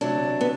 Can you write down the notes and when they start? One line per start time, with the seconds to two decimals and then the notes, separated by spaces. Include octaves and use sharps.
0.01 D2 C3 F#3 D4
0.41 B3